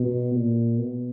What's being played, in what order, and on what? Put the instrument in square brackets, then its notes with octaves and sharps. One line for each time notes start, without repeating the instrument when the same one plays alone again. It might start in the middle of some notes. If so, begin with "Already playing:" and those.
Already playing: [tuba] B2
A#2
B2